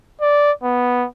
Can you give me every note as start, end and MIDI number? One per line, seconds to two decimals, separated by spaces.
0.21 0.52 74
0.64 1.06 59